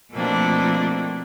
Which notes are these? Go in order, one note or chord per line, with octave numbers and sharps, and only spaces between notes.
B2 F3 A3 A#3 C4 D4